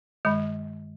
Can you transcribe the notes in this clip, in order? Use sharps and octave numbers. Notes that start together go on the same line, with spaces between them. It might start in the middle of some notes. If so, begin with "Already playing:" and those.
G2 D#3 G#3